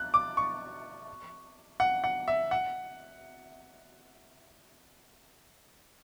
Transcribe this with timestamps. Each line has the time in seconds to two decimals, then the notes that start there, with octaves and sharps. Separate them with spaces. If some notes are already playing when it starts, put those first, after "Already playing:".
Already playing: F#6
0.14 D6
0.37 C#6
1.80 F#5
2.04 F#5
2.28 E5
2.51 F#5